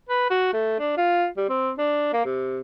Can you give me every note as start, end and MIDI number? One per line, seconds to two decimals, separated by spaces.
0.09 0.28 71
0.30 0.49 66
0.53 0.77 57
0.79 0.92 62
0.97 1.26 65
1.37 1.44 55
1.49 1.72 60
1.78 2.09 62
2.13 2.25 58
2.25 2.60 48